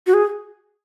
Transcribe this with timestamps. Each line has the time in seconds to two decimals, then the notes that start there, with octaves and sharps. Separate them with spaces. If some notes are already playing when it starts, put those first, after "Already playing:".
0.07 F#4
0.14 G#4